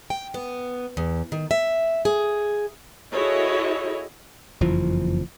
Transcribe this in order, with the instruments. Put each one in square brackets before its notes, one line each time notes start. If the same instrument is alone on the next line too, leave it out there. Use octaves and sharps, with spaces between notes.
[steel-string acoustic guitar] G5
B3
E2
D#3
E5
G#4
[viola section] E4 F#4 G#4 A4 C#5 D#5
[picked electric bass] F#1 F2 E3 F3